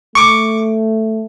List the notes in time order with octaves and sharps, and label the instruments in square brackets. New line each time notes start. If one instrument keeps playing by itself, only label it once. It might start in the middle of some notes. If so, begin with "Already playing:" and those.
[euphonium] A3 [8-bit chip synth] C#6 D6